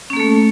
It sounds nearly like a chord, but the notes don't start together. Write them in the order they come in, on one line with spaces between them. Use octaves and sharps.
C#4 A#3 A4 A3